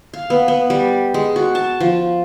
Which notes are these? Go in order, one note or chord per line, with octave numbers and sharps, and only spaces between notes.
F5
B3
B3
G3
G#3
F#4
A5
F3